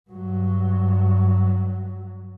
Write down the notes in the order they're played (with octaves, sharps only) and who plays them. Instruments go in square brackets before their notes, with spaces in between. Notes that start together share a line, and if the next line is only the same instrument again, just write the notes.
[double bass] G2 F#3